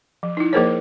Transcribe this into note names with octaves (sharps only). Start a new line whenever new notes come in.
F3
D#4 E4
F3 A#3 G#4 A#4 C5 C#5